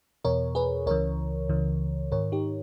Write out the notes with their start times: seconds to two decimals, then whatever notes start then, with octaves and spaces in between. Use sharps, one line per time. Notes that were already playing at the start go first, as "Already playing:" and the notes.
0.24 E2 B2 A#4 C#5
0.55 G#4 B4
0.86 C#2 C#3 E3 A#4 C#5
1.49 C#2 C#3 E3
2.12 G#2 D#3 A#4 C#5
2.32 D#4 G4